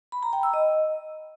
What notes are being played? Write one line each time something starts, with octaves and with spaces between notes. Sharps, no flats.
B5
A#5
G5
E6
D#5